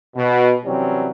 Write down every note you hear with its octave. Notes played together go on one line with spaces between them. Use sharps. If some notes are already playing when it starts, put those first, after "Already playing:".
B2
C3 E3 F#3 G3 C4 C#4